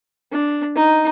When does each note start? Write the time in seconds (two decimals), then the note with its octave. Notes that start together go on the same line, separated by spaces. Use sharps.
0.32 D4
0.76 D#4